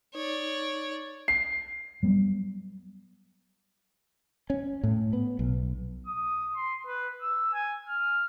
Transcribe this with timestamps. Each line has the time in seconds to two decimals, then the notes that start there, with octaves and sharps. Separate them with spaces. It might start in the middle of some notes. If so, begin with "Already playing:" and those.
0.15 D#4 C#5 D5
1.28 C7
2.03 F#3 G3 B3
4.50 C#4
4.83 A2
5.13 B3
5.39 B1
6.07 D#6
6.56 C6
6.87 B4
7.22 E6
7.53 G#5
7.89 F6